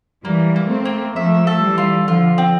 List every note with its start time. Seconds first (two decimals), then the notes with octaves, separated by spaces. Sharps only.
0.25 E3 G3 A#3
0.56 A#3
0.71 A3 C4
0.85 A#3
1.16 F3 A3 E5
1.47 A4
1.62 E3 G3
1.78 F4
2.08 D3 F3 F4
2.38 C4